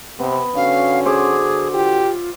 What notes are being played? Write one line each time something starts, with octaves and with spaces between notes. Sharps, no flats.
C3 B3 C4 D#5
D3 C#4 F#4 F5
G#4 C5 E5 D6
F4 G4